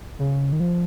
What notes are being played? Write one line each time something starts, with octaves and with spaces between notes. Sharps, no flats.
C#3
D#3
F3